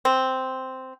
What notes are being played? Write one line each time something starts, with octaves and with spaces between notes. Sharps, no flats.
C4